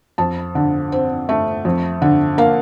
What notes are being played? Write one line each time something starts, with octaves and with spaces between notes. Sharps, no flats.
F2 A5
D3
C4
A3
F2
D3
A#3 F5